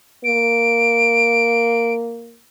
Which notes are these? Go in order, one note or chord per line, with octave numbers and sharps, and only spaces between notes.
A#3 D7